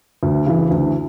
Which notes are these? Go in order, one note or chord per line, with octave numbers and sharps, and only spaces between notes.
D2
C#3 E3
D2